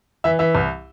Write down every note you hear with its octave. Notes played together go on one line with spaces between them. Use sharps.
E3 E5
E3 E5
C2